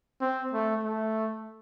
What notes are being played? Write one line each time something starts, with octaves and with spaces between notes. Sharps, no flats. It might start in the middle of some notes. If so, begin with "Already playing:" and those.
C4
A3
A3